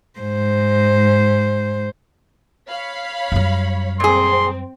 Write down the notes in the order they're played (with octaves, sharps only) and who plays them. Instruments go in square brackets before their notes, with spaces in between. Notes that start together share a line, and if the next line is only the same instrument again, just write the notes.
[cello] G#2 C5
[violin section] C#5 F5 B5
[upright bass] F#2 G3
[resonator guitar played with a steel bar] A#2 G#4 [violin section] C4 [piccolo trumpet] C6